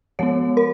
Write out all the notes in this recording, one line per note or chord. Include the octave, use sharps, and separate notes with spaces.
F3 G#3 B3 C#5
A#4